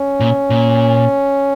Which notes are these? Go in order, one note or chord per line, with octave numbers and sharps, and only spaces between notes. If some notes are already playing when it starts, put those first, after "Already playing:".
Already playing: C#4
A#2
A#2